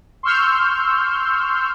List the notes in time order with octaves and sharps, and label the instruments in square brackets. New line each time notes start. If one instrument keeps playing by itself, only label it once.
[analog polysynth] C6 C#6 E6 F6 G6